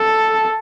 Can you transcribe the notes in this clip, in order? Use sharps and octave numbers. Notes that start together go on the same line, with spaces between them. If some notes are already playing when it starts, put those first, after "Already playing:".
Already playing: A4